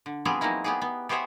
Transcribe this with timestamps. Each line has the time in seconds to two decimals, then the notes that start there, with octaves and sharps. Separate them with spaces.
0.06 D3
0.25 F3 G3 B3 C4 G4 G#4
0.41 F#3 G#3 A#3 D#4 E4
0.64 B3 G4 G#4
0.81 B3
1.09 B3 G4 G#4 C5 C#5 E5